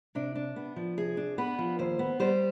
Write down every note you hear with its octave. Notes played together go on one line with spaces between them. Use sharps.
C3 D4
D4
B3
F3
C3 G#4
D4
B3 B4
F3
D#2 C5
B3
G3 C5